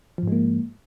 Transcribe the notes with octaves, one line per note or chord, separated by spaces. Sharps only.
G#2 F3 G#3 A#3